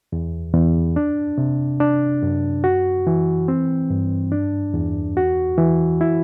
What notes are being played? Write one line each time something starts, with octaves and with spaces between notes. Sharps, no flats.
E2
E2
D4
C3
D4
F#2
F#4
E3
C4
G2
D4
E2
F#4
E3
E4